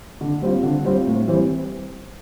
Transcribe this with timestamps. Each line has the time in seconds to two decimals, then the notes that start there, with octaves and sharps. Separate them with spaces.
0.21 D3
0.42 G3 C4 F4
0.63 D3
0.84 G3 C4 F4
1.06 A2
1.28 E3 G3 C4